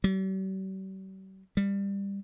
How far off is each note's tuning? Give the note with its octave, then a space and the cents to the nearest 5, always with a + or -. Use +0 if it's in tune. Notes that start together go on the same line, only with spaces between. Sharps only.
G3 -45
G3 +20